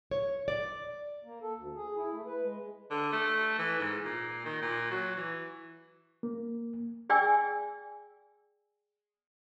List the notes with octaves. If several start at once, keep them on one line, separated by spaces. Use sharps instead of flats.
C#5
D5
A#3
A4
D2
G#4
E4
A3
B4
G#3
D3
A3
E3
G#2
A#2
D#3
A#2
F#3
E3
A#3
G#4 D5 G5 G#5 E6